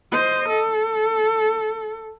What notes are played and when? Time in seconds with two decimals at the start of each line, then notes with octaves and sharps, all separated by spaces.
0.12 C5 D#5
0.49 A4